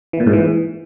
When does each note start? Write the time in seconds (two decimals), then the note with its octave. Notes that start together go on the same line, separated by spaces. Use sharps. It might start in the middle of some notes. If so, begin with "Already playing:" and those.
0.13 E3
0.20 A#2
0.26 G#2
0.33 E3